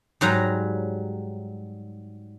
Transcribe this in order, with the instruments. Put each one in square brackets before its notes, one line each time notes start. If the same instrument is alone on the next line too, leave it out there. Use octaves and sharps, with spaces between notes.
[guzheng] G#2 F#3 G3 A#5